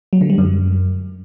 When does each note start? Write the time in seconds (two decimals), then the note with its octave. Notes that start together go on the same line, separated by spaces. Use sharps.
0.13 F#3
0.21 D3
0.30 G3
0.38 F#2